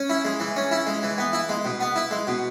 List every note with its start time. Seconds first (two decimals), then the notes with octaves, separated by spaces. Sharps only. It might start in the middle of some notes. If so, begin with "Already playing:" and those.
Already playing: C#4
0.10 E4
0.25 G#3
0.40 E3
0.56 C#4
0.71 E4
0.87 G#3
1.03 E3
1.18 B3
1.33 E4
1.49 G#3
1.65 B2
1.80 B3
1.96 E4
2.11 G#3
2.27 B2